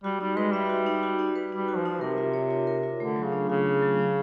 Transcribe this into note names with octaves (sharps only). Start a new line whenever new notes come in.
G3 F#4
G3 D#4
G#3 B4
G3 E5
F#4
D#4
F#4
D#4
B4
G3 D#4
F#4
F3
D#4
C3 A#4
F4
C#5
F4
A#4
F4
D3 A3
F#3
C#3
D4
C#3 F4
A3
F#3
C#4